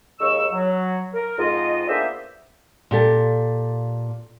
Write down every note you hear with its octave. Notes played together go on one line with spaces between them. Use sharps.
D#2 C#3 G#3 D#4 C#6 E6
F#3
A#4
F2 G#2 F4 D#5
A#3 B3 D4 G#4 C5 E5
A#2 G4 A4